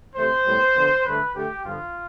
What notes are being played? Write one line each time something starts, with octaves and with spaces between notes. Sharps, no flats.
C3 E3 A3 C5
A2 G3 B3
D3 F3 B3
G2 D3 A3 B4
D3 A3 G4
G2 D3 F3 B3 F4